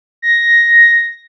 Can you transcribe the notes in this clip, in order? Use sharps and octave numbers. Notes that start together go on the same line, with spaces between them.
A#6